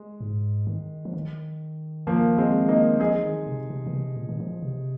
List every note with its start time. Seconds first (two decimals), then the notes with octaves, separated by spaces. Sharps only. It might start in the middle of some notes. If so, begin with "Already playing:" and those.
Already playing: G#3
0.21 G#2
0.67 D#3
1.05 F3
1.13 D#3
2.07 F3 A#3
2.38 G#3 C4
2.68 A#3 D#4
3.00 F3 D#4 G#4
3.23 D#3
3.47 C3
3.70 C3
3.87 D#3
3.93 C3
4.17 A#2
4.29 D#3
4.40 F3
4.62 C3